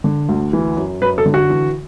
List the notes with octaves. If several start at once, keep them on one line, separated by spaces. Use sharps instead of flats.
D3
D2
E3
F#2
F#2 B4
A4
D3
F#4
E3